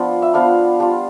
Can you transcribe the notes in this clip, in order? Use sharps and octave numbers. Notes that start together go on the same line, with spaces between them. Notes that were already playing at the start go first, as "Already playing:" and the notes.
Already playing: F3 B3 D4 F4 B5
E5
F3 B3 D4 F4 F5
G3 D4 F4